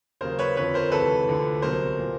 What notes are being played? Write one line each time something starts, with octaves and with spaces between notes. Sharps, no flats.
D#2 C#3 F#3 A#4 C5
B4 C#5
F2 D3 F3 B4 C#5
A#4 C5
C#2 C3 E3 A4 B4
D2 D3 F3
C2 B2 F#3 A#4 C5
A#2 F3